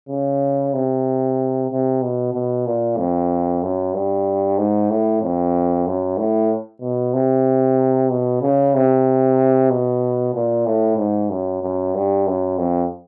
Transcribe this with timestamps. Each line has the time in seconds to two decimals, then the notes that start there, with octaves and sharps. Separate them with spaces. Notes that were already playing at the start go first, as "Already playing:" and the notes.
0.09 C#3
0.73 C3
1.70 C3
2.02 B2
2.34 B2
2.66 A#2
2.97 F2
3.62 F#2
3.94 G2
4.58 G#2
4.90 A2
5.22 F2
5.86 F#2
6.18 A2
6.82 B2
7.14 C3
8.10 B2
8.42 C#3
8.75 C3
9.71 B2
10.34 A#2
10.66 A2
10.97 G#2
11.30 F#2
11.63 F#2
11.94 G2
12.27 F#2
12.58 F2